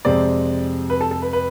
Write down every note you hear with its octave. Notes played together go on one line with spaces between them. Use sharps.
F2 C3 G#3 C4 D5
B4
A4
A4
B4
B4